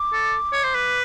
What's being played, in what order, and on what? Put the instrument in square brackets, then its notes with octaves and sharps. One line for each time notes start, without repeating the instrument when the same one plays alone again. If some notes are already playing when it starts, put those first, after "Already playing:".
Already playing: [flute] D6
[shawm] A4
C#5
C5
B4